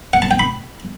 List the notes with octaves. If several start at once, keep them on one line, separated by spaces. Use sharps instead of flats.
F#5
A5
G5
B5